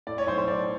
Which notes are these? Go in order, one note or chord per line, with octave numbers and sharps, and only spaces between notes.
A2 D5
C#5
B1 C5
C5
B1 D5